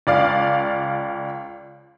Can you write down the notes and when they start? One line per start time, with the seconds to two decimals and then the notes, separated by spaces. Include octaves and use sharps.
0.07 C#2 D5 F5